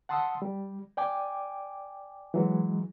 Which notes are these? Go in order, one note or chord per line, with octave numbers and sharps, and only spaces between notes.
F#5 A5 C6 D#6 E6
G3
D5 G5 G#5 D6
E3 F#3 G#3